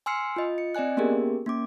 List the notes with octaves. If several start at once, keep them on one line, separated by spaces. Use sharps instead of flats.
G#5 C6 E6 F6 C7 C#7
F4 D#5
C#7
C4 D5 D#5 G#5 F#6
A#3 B3 C#4 G4 G#4 A#4
A#3 C#4 D6